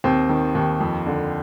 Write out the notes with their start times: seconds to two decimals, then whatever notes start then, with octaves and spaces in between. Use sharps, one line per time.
0.04 D#2 C4
0.29 D#3
0.55 D#2
0.80 F2
1.06 D3